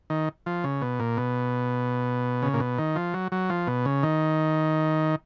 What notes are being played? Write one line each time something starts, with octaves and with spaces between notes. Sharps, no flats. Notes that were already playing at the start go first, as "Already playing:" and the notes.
D#3
F3
C#3
B2
A#2
B2
C#3
A#2
B2
D#3
F3
F#3
F#3
F3
B2
C#3
D#3